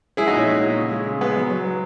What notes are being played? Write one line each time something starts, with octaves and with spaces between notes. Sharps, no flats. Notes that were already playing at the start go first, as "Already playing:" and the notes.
G#3 E4 G#4
D#4 F#4
A#2 C#4 E4
G#3
A#2
C#3
G#3
C#3
G#3 B3
F#3
F#3
F#3